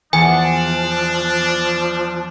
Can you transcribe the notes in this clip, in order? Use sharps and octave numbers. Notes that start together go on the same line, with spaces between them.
E2 F3 D4 G#5